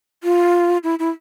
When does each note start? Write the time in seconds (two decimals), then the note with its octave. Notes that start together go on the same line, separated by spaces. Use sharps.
0.24 F4
0.84 E4
0.99 E4